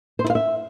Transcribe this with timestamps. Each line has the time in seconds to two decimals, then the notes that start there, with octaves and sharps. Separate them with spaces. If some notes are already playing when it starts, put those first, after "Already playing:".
0.19 C5
0.24 E4
0.30 F5
0.35 E5